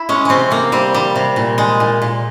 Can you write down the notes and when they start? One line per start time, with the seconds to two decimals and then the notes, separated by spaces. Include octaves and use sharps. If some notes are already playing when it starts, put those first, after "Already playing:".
Already playing: E4
0.09 G#3 C#4
0.25 C3 C4 C#4
0.50 C3 A#3
0.72 G3 C4
0.95 G3
1.16 C3
1.36 A#2
1.58 G#3
1.80 A#2
2.02 A#2